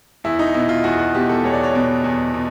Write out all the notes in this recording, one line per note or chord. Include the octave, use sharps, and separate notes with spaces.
E2 E4
D#4
B2 E4
F4
E2 F#4
F#4
B2 G4
A4
E2 C#5
D5
C#5
B2
E2
B2